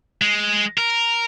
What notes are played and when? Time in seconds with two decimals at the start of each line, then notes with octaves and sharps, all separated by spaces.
0.22 G#3
0.78 A#4